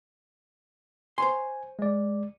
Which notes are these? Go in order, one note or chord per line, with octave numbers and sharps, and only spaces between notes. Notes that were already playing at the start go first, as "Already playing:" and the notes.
C5 C#5 G#5 C6
G#3 D5